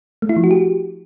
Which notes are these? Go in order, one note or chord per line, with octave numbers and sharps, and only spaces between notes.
A3
E4
F3
F#4
G4